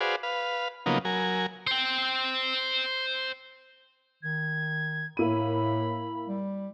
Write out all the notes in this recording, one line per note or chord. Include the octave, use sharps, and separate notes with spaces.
F#4 G#4 B4 C5 D5 F5
B4 F5
C#3 F3 F#3 A#3 B3 D#4
F#3 A#4 G#5
C5 G5
D#3 G#6
A2 A#3 E4 B5 D#7
G3